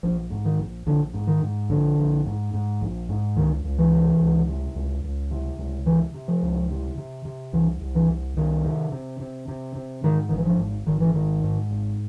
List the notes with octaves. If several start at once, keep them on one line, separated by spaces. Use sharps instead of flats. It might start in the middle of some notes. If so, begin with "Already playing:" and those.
A#1 F3
G#2
D#3
A#1
A#1 D3
G#2
D#3
G#2
A#1 D3
A#1
G#2
G#2
A#1
G#2
C#2 D#3
C#2
E3
C3
C#2
C3
C#2
C#2
C3
C#2
C3 E3
C3
F3
C#2
C3
C3
C3
C2 E3
C2
E3
C2
C2 D#3
C3
C3
C3
C3
C3
G#2 D#3
G#1 D#3
E3
F3
G#1
G#1 D#3
E3
G#2 D#3
G#2
G#1